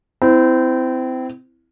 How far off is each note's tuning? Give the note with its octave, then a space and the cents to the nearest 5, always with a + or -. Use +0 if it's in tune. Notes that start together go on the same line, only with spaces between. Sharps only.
C4 -25 E4 +0